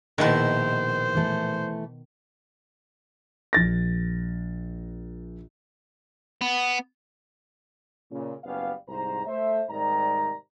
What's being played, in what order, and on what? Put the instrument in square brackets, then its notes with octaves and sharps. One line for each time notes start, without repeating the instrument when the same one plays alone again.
[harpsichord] A#1 E4 [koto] B2 D#3 [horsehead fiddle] C5
[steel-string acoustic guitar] E3 A3
[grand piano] A#1 A6 A#6
[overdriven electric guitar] B3
[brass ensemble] A#2 C#3 C#4
F#1 G3 B3 C#4 F5
C2 G#2 C5 A#5
A3 C5 E5
G#2 C3 D#3 G3 D5 A#5